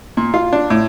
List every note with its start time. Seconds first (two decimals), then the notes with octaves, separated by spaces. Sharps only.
0.17 A#2
0.34 F4
0.53 D4
0.70 A2